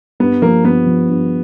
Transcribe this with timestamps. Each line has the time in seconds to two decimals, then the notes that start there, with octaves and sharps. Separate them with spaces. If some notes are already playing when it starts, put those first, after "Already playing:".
0.20 G2 B3
0.42 F3 A#3
0.65 G2 B3
0.86 F3
1.08 G2